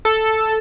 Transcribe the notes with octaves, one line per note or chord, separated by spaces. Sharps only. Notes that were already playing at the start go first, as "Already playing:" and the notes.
A4